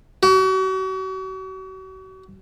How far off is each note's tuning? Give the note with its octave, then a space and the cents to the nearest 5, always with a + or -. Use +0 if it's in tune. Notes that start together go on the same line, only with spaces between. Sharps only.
F#4 +40